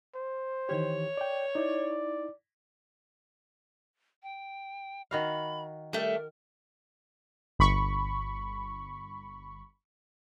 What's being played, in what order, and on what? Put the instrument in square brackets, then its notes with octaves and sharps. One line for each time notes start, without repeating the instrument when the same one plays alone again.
[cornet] C5
[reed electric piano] D#3 E3 G4 [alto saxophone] C#5
[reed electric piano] D5 G5
[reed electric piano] D#4 E4 [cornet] D5
[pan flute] G5
[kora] D#3 F#4 F5 [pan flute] B5
[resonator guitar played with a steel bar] G3 A3 [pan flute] A#4
[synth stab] G1 B5 C#6